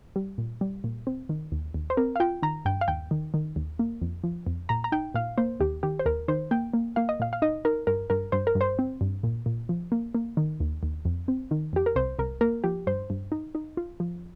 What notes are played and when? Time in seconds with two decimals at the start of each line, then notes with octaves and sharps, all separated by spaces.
0.16 G3
0.38 A#2
0.61 G3
0.84 A#2
1.07 C4
1.29 D#3
1.52 D#2
1.74 D#2
1.90 C5
1.97 C4 A#4
2.16 F5
2.20 F4 G5
2.42 D#3 A#5
2.65 G2 G5
2.81 F5
2.88 D#2 G5
3.11 D#3
3.34 D#3
3.56 D#2
3.79 A#3
4.01 F2
4.24 F3
4.47 F2
4.69 A#2 A#5
4.84 A#5
4.92 D#4 G5
5.14 A#2 F5
5.38 A#3 C5
5.60 D#2 G4
5.83 D#3 G4
5.99 C5
6.06 D#2 A#4
6.28 D#3 C5
6.51 A#3 G5
6.74 A#3
6.96 A#3 F5
7.09 D#5
7.20 A#2 F5
7.33 F5
7.42 D#4 D#5
7.65 D#4 A#4
7.87 G2 A#4
8.10 G2 A#4
8.32 G2 C5
8.47 A#4
8.55 G2
8.61 C5
8.79 C4
9.01 G2
9.23 A#2
9.46 A#2
9.69 F3
9.92 A#3
10.15 A#3
10.37 D#3
10.60 D#2
10.83 D#2
11.05 F2
11.28 C4
11.51 D#3
11.73 F2 G4
11.86 A#4
11.96 C2 C5
12.19 C2 A#4
12.41 A#3 A#4
12.64 F3 G4
12.87 G2 C5
13.10 G2
13.32 D#4
13.55 D#4
13.77 F4
14.00 F3